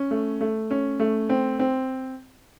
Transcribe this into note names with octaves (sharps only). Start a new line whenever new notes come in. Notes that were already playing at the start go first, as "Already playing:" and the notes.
Already playing: C#4
A3
A3
C#4
A3
C4
C4